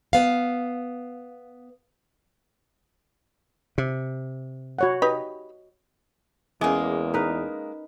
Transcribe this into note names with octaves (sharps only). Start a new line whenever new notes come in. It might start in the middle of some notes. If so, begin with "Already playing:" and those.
B3 F5
C3
F#4 C#5 F#5
D#4 G4 B4 D#5
E2 G#3 A#3 C#4 G#5 D6
D#4 A#4 B4